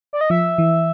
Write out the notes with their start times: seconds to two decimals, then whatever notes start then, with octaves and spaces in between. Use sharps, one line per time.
0.13 D5
0.21 D#5
0.30 F3 E5
0.58 E3